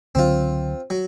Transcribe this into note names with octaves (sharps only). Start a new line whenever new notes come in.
C#2 D3 F#3 C4 F4
F#3